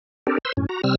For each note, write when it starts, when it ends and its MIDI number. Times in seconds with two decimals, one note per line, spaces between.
0.27 0.38 60
0.27 0.38 62
0.27 0.38 67
0.27 0.38 69
0.27 0.38 70
0.45 0.52 71
0.45 0.52 72
0.45 0.52 84
0.45 0.52 88
0.57 0.66 42
0.57 0.66 45
0.57 0.66 61
0.69 0.81 66
0.69 0.81 82
0.84 0.95 48
0.84 0.95 55
0.84 0.95 60
0.84 0.95 88
0.84 0.95 89